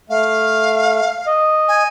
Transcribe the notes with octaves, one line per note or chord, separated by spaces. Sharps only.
A3 F5
D#5
G#5